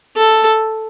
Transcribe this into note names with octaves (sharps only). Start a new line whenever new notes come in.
A4